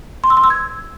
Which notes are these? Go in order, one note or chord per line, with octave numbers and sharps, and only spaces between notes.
C6
E6
C6
E6
G#6